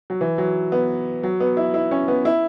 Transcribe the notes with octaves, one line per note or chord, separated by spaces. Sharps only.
F#3
E3
F#3
B3
F#3
B3
E4
E4
C#4
B3
E4